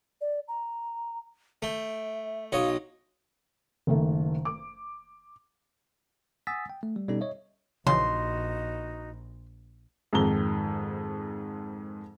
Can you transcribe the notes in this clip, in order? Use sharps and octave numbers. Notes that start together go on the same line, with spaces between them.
D5
A#5
A3 E5 G5
B1 C#5 D#5 F5
F#1 D#3 A3
D6
F#5 G#5 D#6 E6 A6 B6
G5
A3
G3
B2 G3 B3 C#4 D#4 A4
C#5 D#5 E5
A#1 C#3 E3 F3 D#4 F#4 D#5 C6
F2 G#2 D#3 A#5 G7